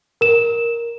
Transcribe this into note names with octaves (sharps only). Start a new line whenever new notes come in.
A#4 E7